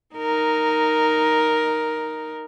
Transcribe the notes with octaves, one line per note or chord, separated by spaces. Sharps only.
D#4 A#4